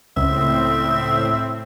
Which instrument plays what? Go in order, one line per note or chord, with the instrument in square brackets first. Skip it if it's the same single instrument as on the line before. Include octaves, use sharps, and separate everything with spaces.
[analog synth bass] C#2 [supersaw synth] A2 C4 [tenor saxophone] E5